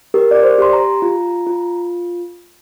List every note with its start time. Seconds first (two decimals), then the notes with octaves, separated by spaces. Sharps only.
0.14 G4 A#4
0.31 D5
0.43 C5
0.58 G4 C6
0.73 A#5
1.02 F4
1.47 F4